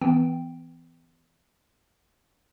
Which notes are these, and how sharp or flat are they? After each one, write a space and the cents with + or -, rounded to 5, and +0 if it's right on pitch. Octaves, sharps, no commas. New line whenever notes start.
E3 +0 B3 +35 G5 +0